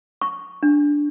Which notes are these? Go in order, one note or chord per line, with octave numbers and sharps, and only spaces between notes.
C#6
D4